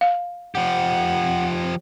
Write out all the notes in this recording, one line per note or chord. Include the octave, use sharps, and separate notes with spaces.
F5
F3 G4 F#5